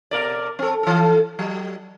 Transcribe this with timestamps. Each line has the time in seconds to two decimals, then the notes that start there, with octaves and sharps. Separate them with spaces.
0.11 B2 A#4 D5
0.59 C4 A4
0.83 E3 A4
1.39 F#3